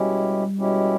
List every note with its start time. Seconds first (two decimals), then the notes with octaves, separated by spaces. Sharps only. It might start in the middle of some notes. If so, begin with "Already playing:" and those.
Already playing: B2 G3 G#3 C#4 E4 G4
0.58 B2 G#3 C#4 E4 G4